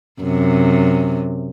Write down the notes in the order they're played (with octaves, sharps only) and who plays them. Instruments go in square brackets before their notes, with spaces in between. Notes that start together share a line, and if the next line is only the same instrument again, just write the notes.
[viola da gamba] F#2 C3